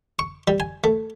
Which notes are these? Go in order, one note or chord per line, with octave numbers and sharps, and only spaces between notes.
C#6
G3
G#5
A3